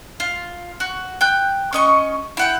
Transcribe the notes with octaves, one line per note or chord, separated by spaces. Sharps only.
F4
F#4
G5 F#6
C#4 D#5 C#6
E4 F#5 G5